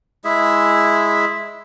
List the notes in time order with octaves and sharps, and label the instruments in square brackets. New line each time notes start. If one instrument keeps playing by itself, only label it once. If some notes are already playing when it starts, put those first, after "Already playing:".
[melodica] G#3 E4 G#4 E5